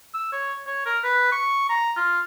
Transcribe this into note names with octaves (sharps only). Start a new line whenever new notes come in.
E6
C#5
C#5
A#4
B4
C#6
A#5
F4